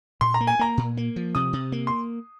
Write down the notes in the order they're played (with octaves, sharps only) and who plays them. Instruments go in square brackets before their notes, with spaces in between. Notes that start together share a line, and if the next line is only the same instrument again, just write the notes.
[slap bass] A#2 [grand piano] C6
[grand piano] A#5
[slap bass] A#3
[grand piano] G#5
[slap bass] A#3 [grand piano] A#5
[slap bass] A#2
A#3
F3
[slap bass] C3 [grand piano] D#6
[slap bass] C3
A#3
[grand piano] C6